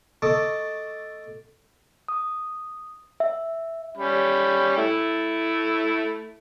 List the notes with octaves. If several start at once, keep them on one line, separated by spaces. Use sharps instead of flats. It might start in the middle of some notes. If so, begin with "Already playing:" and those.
A3 A4 D#5 A5 C#6 D6
D#6
E5
G3 C#4 B5
A3 E4